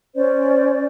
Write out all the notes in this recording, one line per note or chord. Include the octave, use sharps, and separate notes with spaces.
C#4 C5 D5